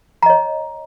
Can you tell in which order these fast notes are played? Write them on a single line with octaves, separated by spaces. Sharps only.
A#5 D#5 C#5